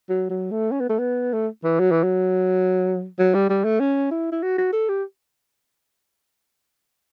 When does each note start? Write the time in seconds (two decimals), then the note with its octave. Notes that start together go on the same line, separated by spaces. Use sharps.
0.09 F#3
0.30 F#3
0.51 A3
0.71 C#4
0.80 B3
0.89 A3
0.99 B3
1.33 A3
1.64 E3
1.80 F#3
1.91 E3
2.04 F#3
3.19 F#3
3.34 G3
3.50 G3
3.65 A3
3.80 C#4
4.11 E4
4.32 E4
4.43 F#4
4.58 F#4
4.73 A4
4.89 G4